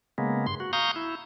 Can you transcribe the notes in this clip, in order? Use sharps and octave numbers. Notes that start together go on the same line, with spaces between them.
C#3 G#3 A#3 B3
G2 C6
F#4
F5 A#5 C#6 D#6 G6
E4